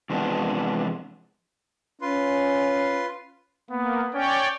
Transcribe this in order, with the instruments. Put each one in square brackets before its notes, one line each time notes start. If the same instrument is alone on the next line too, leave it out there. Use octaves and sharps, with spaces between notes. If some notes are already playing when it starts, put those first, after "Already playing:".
[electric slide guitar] E2 C3 F3 G#3 B3 D4
[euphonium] C#4 [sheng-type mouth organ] F4 B4 C6
[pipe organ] A#3 [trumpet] B3
[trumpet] C#4 [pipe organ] C#5 D5 G5